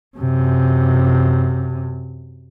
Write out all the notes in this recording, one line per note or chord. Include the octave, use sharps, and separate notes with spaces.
F#2 C3